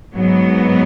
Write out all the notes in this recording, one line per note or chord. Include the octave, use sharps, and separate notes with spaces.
G#2 F#3 B3